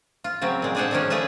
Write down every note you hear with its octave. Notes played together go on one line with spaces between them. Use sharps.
F4
C#3 F#3 C4
A#2 G#3
G#3 D4 G#4 A4 C5 F#5
D3 D#3 F3 G#3 C#4
C#3 A3 G#4 B4 E5 A5